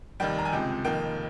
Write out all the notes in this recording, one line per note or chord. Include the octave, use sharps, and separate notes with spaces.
F1 D#2 D#3 G3 G5
A#5
G#5
C#2 C3 F3 G#3 G5
F1 F2 D#3 A#3 G5